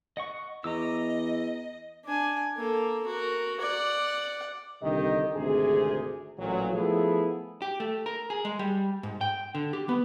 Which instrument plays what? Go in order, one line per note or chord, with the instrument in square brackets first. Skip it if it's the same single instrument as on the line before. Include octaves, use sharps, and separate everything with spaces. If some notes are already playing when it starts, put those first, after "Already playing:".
[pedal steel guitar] D#5 F#5 C#6
[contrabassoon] E2 [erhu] D#5 [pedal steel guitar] A#5 D6 E6
[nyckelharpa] D4 G#5
A#3 A4
F#4 A#4
D5 F#5
[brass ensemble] C2 D3 D#3 D#4 G4 D#5
G#1 D2 C3 G#4
A1 A#2 F#3
F3 A3 B3 E4 G#4 A4
[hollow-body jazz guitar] G4
A3
A#4
G#4
G#3
G3
G#2
G5
D3
G4
B3